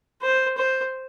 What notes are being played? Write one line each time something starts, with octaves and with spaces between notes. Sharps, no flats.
C5
C5